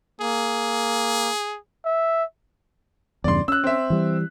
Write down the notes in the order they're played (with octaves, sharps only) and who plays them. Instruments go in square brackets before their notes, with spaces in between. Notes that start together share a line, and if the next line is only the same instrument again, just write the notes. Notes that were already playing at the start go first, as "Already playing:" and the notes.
[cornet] A#3 [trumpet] G#4
[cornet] E5
[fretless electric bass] E2 G2 C#3 [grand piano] D5 C6
[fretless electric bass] C#4 [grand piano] E6 F#6
[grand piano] C4 E5
[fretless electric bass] E3 G3